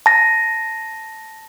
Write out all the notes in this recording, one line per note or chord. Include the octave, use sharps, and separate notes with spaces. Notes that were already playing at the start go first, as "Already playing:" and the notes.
A5 A#6